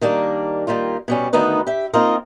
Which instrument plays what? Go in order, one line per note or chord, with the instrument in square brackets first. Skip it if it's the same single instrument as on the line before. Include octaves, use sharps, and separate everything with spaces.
[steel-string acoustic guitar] D#3 G3 A#3 D4
D#3 G3 A#3 F4
B2 G3 C#4
D2 D#3 B3 D#4 B4
G4 E5
A#3 C4 D#4 F4 A#4 D#5